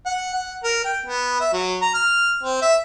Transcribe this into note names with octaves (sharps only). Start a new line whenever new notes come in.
F#5
F#5
A#4
G5
B3
E5
F#3
A#5
F6
C4
E5